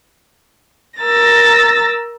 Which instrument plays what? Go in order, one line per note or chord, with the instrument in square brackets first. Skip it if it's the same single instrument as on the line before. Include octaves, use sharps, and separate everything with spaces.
[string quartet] A#4 E6 A6 A#6